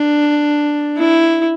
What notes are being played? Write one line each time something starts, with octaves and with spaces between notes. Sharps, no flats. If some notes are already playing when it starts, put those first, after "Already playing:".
Already playing: D4
E4